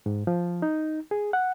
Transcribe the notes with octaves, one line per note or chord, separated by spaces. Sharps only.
G#2
F3
D#4
G#4
F#5